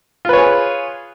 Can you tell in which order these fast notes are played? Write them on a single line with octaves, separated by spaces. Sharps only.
F4 B4 C#5 G#4